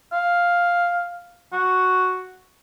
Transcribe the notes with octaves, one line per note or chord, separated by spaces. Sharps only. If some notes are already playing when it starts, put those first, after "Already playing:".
F5
F#4